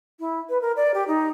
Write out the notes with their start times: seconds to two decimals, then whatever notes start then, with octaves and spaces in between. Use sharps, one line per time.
0.20 E4
0.49 B4
0.61 A#4
0.76 D5
0.94 G4
1.08 D#4